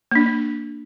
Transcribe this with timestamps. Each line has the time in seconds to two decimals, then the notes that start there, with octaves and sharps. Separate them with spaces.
0.11 A#3 D4